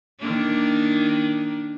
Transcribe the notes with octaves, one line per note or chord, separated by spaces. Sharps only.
D#3 A#3 D4